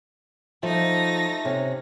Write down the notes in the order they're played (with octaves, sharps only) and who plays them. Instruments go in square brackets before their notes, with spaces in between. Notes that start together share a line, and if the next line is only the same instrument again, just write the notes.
[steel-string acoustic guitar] F3 [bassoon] A3 [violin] D#4 A#6
[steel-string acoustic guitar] C3 [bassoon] C#4